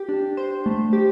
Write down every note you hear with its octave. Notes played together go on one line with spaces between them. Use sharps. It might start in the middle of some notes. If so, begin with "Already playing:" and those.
Already playing: G4
D4
C5
A3
G4